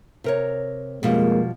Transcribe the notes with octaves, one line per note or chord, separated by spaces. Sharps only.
C3 A#4 C#5
F2 B2 F3 G3 G#3 A#3